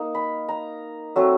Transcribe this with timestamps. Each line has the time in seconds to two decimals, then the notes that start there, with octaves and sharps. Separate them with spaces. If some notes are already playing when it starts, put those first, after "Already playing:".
Already playing: A#3 D#4
0.15 B5
0.49 A#5
1.16 F#3 A3 C4